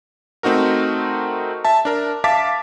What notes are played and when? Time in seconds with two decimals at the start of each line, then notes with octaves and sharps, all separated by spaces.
0.43 A3 C4 D#4 F#4 A#4
1.65 E5 A5
1.85 D4 A#4
2.24 E5 F5 A5 D6 A6 B6